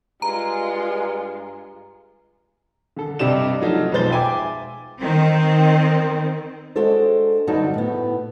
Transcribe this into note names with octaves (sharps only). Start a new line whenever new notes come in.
G2 G#3 F4 A#5
D3 A4
G2 C3 G4 D5 D#5 E7
F3 F#3 A3 D#4 F4
B1 F3 G#3 C5 A6 G7
E5 G5 G#5 D6
D#3 C4
G#3 D4 F#4 A4 C5
G2 D3 F#3 D#4 F#4 A5
A2 B3